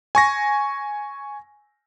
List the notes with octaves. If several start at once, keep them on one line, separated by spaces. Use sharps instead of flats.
G#5 C#6 A#6